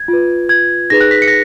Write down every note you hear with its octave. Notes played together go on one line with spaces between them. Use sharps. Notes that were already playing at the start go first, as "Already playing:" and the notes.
Already playing: G#6
F4 B4
G#6
D#4 G#4 B4 A#6
F#6
B6
C#7
A#6